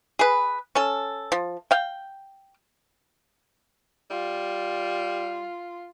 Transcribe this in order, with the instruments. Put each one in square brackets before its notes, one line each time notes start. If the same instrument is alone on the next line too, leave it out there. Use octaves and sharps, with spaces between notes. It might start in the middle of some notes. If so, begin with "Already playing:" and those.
[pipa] G#4 B4
C#4 A4
F3
F5 G5
[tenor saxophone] G3 [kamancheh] F4